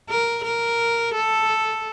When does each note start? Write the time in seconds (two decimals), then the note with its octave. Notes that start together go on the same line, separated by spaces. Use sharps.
0.10 A#4
0.45 A#4
1.15 A4